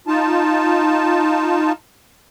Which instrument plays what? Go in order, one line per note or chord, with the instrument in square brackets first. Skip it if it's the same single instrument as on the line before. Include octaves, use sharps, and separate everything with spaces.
[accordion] D#4 F4 A5